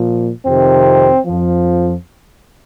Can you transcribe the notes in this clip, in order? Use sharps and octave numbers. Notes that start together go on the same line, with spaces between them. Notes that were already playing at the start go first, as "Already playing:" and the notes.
Already playing: A#2 F3
F2 C3 D#3 C4
F2 F3